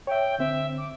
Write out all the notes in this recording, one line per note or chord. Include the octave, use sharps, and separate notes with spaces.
C#5 E5 G5
D3 C4 E5
D6